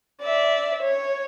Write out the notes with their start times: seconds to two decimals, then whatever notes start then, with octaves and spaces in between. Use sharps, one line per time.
0.22 D5 E5
0.82 C#5